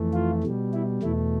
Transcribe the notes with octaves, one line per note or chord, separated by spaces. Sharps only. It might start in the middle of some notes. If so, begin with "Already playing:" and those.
Already playing: F2 E3 A3
F4
B2 G3
E4
E2 B2 A3 E4